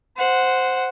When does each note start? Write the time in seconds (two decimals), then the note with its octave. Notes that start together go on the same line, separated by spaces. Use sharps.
0.17 C5 F#5